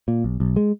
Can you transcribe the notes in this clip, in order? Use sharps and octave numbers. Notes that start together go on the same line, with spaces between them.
A#2
B1
B1
G#3